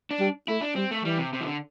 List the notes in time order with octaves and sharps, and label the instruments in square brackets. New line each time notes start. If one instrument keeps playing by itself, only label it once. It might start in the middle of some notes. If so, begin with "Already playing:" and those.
[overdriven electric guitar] D4
[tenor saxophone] G3
[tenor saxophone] A3 [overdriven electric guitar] E4
[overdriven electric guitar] D4
[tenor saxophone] G3 [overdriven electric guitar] C4
[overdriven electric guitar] A3
[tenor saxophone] E3 [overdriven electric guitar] G3
[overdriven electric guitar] C3
C3
E3
D3